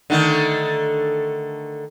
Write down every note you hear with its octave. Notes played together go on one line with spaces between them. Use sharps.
D3 D#3 A3